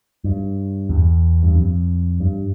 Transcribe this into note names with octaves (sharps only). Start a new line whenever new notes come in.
G2
E2
G2
F2
G2